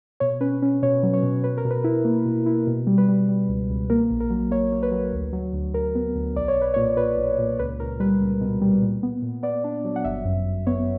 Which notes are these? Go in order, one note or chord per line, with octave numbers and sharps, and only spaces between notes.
B2 C#5
C#4 B4
C#4
B2 C#5
F#3
C#5
B2
B2 B4
A#4
B2
B4
E4
A#3
B2
E4
B2
G3
B4
G3
G3
C#2
C#2
A#3 A#4
A#1
A#4
F#3
A#3 C#5
A#3
B4
F#3
D2
F#3
D2
D2 A#4
B3
D2
B1 D5
C#5
B1
B4
A#2 C#5
A#2 B4
B1
A#2
C#2 B4
C#2 A#4
G3 B4
C#2
B2
G3
A#2
B3
A#2
B3 D5
D4
F#3
F#5
G1 E5
F#2
G1
B3 C#5